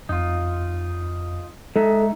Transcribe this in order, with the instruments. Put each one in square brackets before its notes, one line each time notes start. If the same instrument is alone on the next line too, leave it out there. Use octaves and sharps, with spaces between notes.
[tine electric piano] F2 [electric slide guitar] D#4 F4
[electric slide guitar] G#3 D#4 E5 [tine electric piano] A4